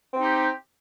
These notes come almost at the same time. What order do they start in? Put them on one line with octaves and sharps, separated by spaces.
C4 D#4 G4